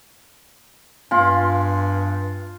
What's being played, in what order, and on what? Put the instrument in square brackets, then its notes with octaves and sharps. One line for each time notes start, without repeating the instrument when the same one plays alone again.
[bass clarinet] G2 [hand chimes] B3 F5 G#5 [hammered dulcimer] F4 C6